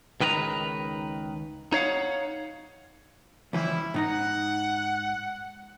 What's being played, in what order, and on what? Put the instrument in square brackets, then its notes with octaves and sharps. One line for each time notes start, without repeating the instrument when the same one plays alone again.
[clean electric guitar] C#2 D#3 B4 C5 A#5
D#4 C#5 F5 F#5
[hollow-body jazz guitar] C#2 E3 F3 [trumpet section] G3 E4
[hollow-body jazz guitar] G#2 D#4 A#5 [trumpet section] F#5